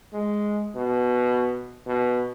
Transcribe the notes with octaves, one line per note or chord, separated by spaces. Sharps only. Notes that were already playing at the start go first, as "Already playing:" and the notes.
G#3
B2
B2